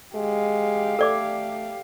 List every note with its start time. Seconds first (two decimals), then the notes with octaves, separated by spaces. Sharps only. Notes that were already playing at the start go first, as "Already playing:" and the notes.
0.15 G#3 G4 F5
0.99 A3 A4 D5 D6